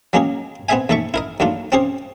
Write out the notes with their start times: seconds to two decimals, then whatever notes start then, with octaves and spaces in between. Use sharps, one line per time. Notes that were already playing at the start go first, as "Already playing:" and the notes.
0.13 F#3 G#3 A#3 C#4 G4 G#4
0.69 B3 C4 G#4 D#5 E5 G#5
0.89 D#2 A3 A4 E5 C#6
1.14 E4 A#4 D#5
1.40 D#2 F#3 A3 D4 F4
1.72 C4 C#4 G4 G#4 C5